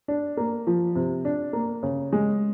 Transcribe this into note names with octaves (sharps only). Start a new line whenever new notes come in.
D4
A#3
F3
C3
D4
A#3
C#3
G#3